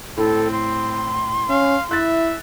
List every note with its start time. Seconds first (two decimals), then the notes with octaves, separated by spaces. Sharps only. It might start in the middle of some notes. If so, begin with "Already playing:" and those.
0.17 A2 C4 A4
0.51 C6
1.49 C#4 F5
1.91 E4 E5 F#6 A6